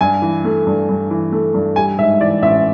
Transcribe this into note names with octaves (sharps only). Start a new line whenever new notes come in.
G2 G#5
E3
A3
G2
G2
E3
A3
G2
G3 G#5
G#2 E5
E3 D5
A1 E5